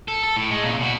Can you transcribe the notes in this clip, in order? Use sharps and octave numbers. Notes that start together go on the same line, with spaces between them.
A4
A4
A2
G#3
A#2 C#3
B2 F#4